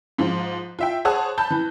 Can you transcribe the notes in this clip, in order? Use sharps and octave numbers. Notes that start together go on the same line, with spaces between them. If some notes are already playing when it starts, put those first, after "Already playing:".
G#2 F3
F4 E5 G5
G#4 C5 C#5 F#5 A5 D#6
A5 B5 G6
E3